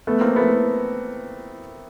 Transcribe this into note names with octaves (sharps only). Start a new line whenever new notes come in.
A3 B3
A#3 C4
A3 B3